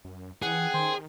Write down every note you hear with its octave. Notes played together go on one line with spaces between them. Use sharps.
F#2
E3 C4 C#4 G4 G#4 F#5
D#3 C5 G5